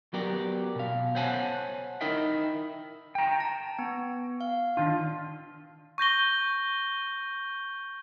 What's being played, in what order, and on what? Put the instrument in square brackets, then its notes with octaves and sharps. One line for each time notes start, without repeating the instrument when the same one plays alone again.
[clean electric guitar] F#3 B3 F#4 G4 A#4 D5
B2 F5
C5 C#5 F#5 G#5 A5
D#4 E4 A#4 D#5 E5 G5
[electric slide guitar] G5 A#5
[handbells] A5
B3
F5
[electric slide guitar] D#3 F4 [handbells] D4
[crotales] C#6 G6 A#6 G7